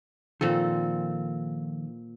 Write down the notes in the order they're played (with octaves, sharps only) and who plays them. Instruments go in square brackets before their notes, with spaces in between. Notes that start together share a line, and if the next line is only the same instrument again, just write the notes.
[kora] A#2 C4 A4 [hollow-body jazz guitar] D#3 F3